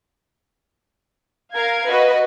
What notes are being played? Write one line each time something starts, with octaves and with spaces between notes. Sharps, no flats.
A#4 F5 G#6
F#4 B4 D#5